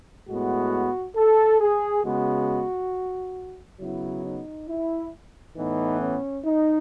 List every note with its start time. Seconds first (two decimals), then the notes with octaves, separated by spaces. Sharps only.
0.29 A2 G#3 B3 F#4
1.16 A4
1.61 G#4
2.05 C#3 G#3 B3 F#4
3.80 C#3 F#3 B3 E4
4.25 D#4
4.69 E4
5.56 A2 E3 B3 D#4
6.01 C#4
6.45 D#4